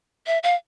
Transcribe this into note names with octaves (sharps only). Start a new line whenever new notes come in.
E5
F5